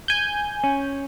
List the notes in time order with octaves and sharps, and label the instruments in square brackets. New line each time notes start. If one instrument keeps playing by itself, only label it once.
[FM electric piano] G#5 G6
[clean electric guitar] C#4